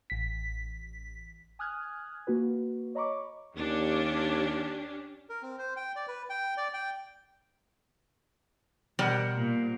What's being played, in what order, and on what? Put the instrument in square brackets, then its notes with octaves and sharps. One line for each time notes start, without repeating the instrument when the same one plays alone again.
[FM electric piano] A1 B6
[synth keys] G#5 D#6 F6 F#6 G#6
A#3 F#4 B4
C#5 D#5 A#5 B5 C#6 D6
[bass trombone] D#2 [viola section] C#4 D4 G4
[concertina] A#4
C4
C5
G5
D5
B4
G5
D5
G5
[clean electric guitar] B2 [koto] G3 [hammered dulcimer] A#4 C5 F#5
[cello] A#2